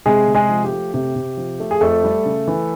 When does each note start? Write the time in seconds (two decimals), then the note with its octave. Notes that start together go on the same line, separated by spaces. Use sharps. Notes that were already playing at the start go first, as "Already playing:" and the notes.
0.06 C3 G#3 G#4
0.27 C3
0.35 G#3 G#4
0.49 F3
0.64 G4
0.72 A3
0.94 C3 G4
1.16 C3
1.37 F3
1.60 A3
1.71 G#4
1.81 F2 A3 A4
2.04 G3
2.26 C#3
2.47 E3